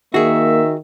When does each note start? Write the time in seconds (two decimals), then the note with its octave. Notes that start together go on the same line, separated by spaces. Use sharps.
0.14 D#3 A#3 F#4 G#4 E5